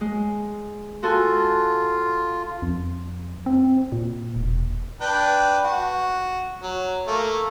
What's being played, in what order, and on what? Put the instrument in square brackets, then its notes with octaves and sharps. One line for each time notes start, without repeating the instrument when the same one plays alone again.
[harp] G#3
[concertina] F4 [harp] F#4 A4 G#5
[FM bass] F2
C4
A#2
E1
[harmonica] D4 B4 G5
F#4
F#3
A3 A#3